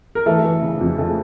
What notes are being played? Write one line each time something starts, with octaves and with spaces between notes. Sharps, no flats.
A#4
E3 A3 A4
E3
C#3
F2
C#3 A3 A4